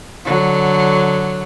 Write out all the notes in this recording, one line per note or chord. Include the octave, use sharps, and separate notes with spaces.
D3 F#3